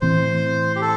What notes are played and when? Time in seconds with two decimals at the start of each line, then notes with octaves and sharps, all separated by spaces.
0.01 A2 E3 C4 C5
0.76 G4
0.81 A4